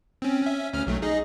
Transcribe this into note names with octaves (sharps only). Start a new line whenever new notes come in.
C4 C#4
C#4 E5
D2 C#4 F6
B1 F#3 A3
D#4 G#4 D#5